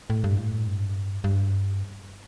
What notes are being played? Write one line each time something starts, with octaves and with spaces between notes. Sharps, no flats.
A2
G2
A2
G2
G2